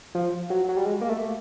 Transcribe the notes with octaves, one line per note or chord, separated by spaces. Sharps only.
F3
F#3
F#3
G3
G#3
A#3
A3